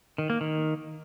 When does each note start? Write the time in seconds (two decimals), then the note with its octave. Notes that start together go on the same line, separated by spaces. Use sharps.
0.18 D#3
0.30 A#3
0.41 D#3